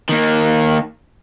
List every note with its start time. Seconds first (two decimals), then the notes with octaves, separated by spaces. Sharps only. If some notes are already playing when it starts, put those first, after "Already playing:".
0.09 D#3 A#3